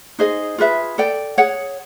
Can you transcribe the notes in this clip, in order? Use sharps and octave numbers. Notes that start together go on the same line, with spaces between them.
D#4 G#4 C5 D#5
F4 G#4 B4 E5
A4 D5 G5
G#4 C#5 F#5